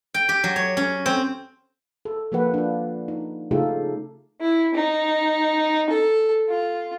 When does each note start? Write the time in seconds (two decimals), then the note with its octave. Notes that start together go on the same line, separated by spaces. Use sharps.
0.14 G5
0.29 G4
0.44 F#3
0.56 C#5
0.77 C#4
1.06 C4
2.05 A4
2.32 D3 F3 A#3 G4 B4 F#5
2.54 D4 F4
3.08 D#4
3.51 C#3 A3 D#4 F4 G4 A4
4.41 E4
4.74 D#4
5.90 A4
6.49 F4